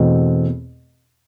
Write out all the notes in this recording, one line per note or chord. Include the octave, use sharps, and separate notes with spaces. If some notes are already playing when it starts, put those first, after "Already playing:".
Already playing: E2 B2 A3 C4